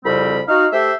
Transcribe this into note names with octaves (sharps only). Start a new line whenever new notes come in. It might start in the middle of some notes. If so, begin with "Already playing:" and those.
C2 F2 C#3 G3 C4 B5
D#4 F#4 F5
A3 G4 C5 E5